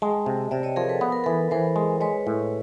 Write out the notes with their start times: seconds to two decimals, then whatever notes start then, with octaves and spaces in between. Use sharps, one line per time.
0.02 G#3 G5 A5
0.26 C3
0.51 C3 D5 E5
0.63 C#5 D#5
0.76 F3 G#4 A#4
0.89 A4 B4
1.01 B3 B4
1.12 A#4
1.24 E3 A4 B4
1.51 E3 A#4 C5
1.76 G#3
2.01 G#3 B4 C#5
2.27 A2